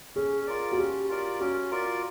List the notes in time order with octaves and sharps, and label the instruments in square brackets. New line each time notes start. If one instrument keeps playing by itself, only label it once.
[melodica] C#4 [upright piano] G#4
[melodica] F4 A#4 D5
[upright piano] F#4
[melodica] C#4 [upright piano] G4
[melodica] F4 A#4 D5
[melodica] C#4 [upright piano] F#4
[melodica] F4 A#4 D5